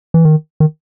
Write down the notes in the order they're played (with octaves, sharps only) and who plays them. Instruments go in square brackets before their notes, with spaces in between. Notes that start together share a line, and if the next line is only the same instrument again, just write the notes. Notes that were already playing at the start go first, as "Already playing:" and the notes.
[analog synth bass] E3
D#3
D#3